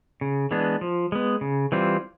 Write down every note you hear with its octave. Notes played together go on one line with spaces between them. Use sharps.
C#3
E3 G#3 B3 D4
F3
G#3 B3
C#3
E3 G3 C4 F4